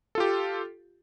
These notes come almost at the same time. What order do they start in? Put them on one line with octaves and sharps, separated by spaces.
A4 F4 G4